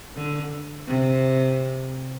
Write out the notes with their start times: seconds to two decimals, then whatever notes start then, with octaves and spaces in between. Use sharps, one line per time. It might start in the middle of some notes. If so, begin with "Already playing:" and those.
0.16 D3
0.88 C3